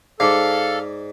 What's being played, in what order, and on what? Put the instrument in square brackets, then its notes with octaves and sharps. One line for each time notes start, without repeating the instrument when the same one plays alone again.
[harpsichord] G#2 [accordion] A4 [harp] D5 D6 [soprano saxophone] F5